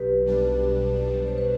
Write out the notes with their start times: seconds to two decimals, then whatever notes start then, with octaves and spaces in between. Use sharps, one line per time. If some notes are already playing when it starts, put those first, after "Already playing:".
Already playing: B1 G4 B4
0.26 B2 G3 D4
0.67 B1
1.08 B2 G3 D4
1.26 C5
1.38 B4